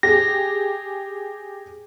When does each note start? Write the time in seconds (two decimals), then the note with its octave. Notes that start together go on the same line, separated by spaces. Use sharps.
0.03 G4 G#4 A#6